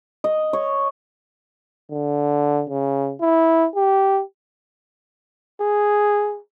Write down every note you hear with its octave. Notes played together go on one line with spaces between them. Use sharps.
D#5
C#5
D3
C#3
E4
G4
G#4